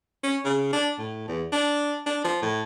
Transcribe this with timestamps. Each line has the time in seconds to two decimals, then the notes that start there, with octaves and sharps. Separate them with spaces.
0.23 C#4
0.45 C#3
0.73 D4
0.99 A2
1.28 E2
1.53 D4
2.06 D4
2.24 F3
2.42 A2